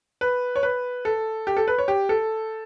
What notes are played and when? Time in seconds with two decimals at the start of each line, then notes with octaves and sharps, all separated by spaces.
0.21 B4
0.56 C#5
0.63 B4
1.05 A4
1.47 G4
1.57 A4
1.68 B4
1.78 C#5
1.88 G4
2.09 A4